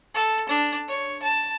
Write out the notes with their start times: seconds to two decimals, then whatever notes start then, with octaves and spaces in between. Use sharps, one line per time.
0.14 A4
0.49 D4
0.88 C#5
1.22 A5